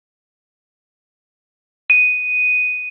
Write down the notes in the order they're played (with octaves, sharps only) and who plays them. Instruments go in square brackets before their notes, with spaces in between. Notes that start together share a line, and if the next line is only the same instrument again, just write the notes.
[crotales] D#7